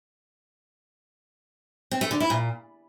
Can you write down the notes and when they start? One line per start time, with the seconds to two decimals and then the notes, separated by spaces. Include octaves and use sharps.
1.91 C4
2.01 A3
2.11 D3
2.20 E4
2.30 A#2